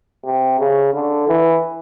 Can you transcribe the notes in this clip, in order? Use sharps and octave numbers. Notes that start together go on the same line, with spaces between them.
C3
C#3
D3
E3